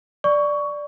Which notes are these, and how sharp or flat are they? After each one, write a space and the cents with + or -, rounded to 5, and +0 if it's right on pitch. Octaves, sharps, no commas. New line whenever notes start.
D5 +0 C#6 +15